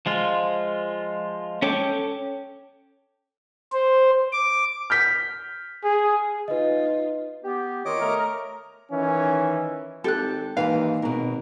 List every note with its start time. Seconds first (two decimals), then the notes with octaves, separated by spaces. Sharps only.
0.06 F3 G#3 F4
1.62 C#4 A4 C#5 G5 D6
3.73 C5
4.33 D6
4.90 F6 G6 B6
5.84 G#4
6.48 D#4 F4 B4 D#5
7.44 B3 G4
7.85 D#3 F4 C#5 D#5 D6
8.00 A3 A#4 A#5
8.91 D#3 E3 C#4
10.04 G#1 G4 A4 F#6
10.57 D#2 G#2 E3 B4 F5
11.02 G#1 B2 A#4